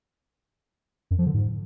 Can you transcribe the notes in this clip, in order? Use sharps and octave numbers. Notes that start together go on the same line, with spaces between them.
F#2
F3
D3
G#2